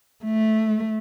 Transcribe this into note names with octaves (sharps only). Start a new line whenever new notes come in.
A3